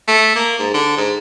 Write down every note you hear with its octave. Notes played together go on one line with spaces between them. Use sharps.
A3
A#3
G#2
D3
G#2